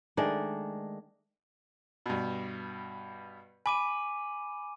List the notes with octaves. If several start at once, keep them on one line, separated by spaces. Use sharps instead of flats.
D#3 G#3 A3 D4
G2 B2
G#5 B5 D6 D#7